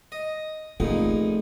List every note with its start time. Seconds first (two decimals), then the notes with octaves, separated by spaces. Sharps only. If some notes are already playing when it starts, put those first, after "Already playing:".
0.12 D#5
0.80 A#1 F2 A3 D#4